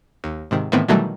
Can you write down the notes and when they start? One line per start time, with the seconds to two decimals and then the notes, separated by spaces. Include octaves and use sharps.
0.24 D#2
0.51 G#2 C3 D#3
0.72 A2 D#3 E3 B3 C4
0.88 B2 D#3 E3 F#3 G3 A3